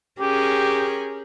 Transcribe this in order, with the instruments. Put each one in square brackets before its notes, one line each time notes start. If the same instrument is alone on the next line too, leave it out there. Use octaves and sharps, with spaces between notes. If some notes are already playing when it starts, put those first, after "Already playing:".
[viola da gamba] C#4 G#4 A#4 [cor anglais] G4